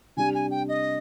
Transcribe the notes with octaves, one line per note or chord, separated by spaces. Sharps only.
C3 G3 D4 G4 G#5
G#5
G5
D#5